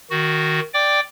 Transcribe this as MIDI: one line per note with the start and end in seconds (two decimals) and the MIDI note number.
0.10 0.60 51
0.10 0.60 66
0.74 1.00 74
0.74 1.00 79
0.74 1.00 86